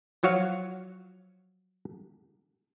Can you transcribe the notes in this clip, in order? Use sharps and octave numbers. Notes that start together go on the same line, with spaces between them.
F3 F#3 F#4 C#5 F5